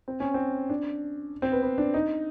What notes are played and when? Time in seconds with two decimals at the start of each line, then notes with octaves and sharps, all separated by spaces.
0.08 C4
0.20 C#4
0.34 C4
0.69 D4
1.42 C4
1.52 B3
1.63 B3
1.78 D4
1.94 D#4